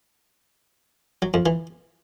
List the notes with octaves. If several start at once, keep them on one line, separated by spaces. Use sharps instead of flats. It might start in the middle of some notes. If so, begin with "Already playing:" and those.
F#3
F2
E3